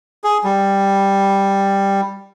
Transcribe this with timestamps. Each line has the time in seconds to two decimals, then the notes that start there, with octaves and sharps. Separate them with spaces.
0.24 G#4
0.44 G3